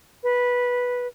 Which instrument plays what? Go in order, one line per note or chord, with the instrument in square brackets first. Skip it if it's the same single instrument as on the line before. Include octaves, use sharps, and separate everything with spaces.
[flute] B4